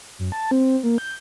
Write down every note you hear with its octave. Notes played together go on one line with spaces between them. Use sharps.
F#2
A5
C4
A#3
G6